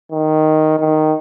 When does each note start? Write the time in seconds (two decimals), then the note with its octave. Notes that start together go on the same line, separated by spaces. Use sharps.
0.12 D#3
0.79 D#3